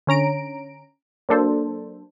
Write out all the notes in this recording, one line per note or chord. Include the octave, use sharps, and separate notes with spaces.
D3 C#4 A#5 D7
F#3 A#3 D4 A4 C5